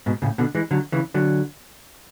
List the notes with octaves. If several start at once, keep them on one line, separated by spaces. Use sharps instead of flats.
G#2 B2
A2 C#3
B2 D3
E3 G#3
D3 F#3
C#3 E3
D3 F#3